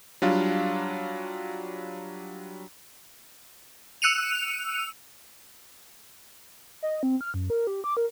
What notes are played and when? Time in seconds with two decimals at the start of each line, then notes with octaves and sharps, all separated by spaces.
0.22 F#3 G3 D4 F4 F5
4.02 E6 F#6 C#7 D#7 F7
6.83 D#5
7.03 C4
7.21 F6
7.34 F#2
7.50 A#4
7.67 G4
7.84 D6
7.97 A#4